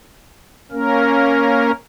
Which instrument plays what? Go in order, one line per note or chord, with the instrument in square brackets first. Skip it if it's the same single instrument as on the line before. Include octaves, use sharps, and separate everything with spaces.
[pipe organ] A#3 C#4 A#4